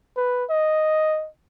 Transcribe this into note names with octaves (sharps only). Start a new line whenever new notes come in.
B4
D#5